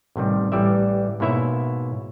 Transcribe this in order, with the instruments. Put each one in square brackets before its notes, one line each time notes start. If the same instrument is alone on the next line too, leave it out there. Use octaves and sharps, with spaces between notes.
[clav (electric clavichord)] A1 C3 D#3 G3
A1 E3 G3 D5 E5
G#2 B2 A#3 E4 C#5 E5